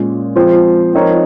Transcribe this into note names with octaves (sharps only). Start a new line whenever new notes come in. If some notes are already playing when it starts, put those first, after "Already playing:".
Already playing: A#2 G#3 C#4
F3 G#3 C4 F4 C5
F3 C4 D#4 A#4 C#5